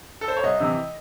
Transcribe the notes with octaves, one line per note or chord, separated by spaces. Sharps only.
A4
C5
C#5
C2 D#5
C3 E3